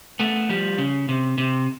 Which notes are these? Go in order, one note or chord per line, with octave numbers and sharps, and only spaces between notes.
A3 B3
F3 G3
C#3
C3
C3